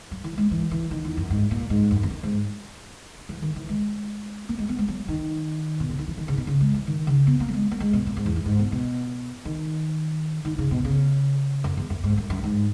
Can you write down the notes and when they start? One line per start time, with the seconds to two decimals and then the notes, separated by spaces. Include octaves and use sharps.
0.11 F#3
0.24 E3
0.38 G#3
0.51 E3
0.71 E3
0.91 D#3
1.04 E2
1.17 F#2
1.31 G#2
1.51 A#2
1.70 G#2
1.91 F#2
2.03 E2
2.10 F#2
2.23 G#2
3.29 E3
3.42 D#3
3.56 E3
3.69 G#3
4.49 A#3
4.59 G#3
4.69 B3
4.79 G#3
4.88 F#3
5.08 D#3
5.80 B2
5.89 C#3
5.99 D#3
6.08 E3
6.17 D#3
6.28 C#3
6.37 B2
6.47 C#3
6.61 G#3
6.74 E3
6.87 D#3
7.07 C#3
7.27 B3
7.40 A#3
7.49 F#3
7.54 G#3
7.71 A#3
7.80 G#3
7.93 B2
8.07 A#2
8.17 G#2
8.26 E2
8.36 F#2
8.46 G#2
8.59 B2
8.72 B2
9.45 D#3
10.45 D#3
10.58 C#3
10.71 B2
10.85 C#3
11.64 F#2
11.77 E2
11.90 F#2
12.04 G#2
12.17 F#2
12.30 F#2
12.44 G#2